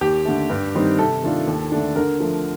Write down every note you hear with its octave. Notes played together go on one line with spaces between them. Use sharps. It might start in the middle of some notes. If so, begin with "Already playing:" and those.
D#2 G4
D3 A3
G2
D#3 G3 C4 D#4
C3 A4
D#3 A3 D4 F4
D#2
D3 A3 D4
D3 A#4
F3 A3